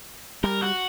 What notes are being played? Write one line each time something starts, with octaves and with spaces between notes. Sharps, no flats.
G3 A#4
F#4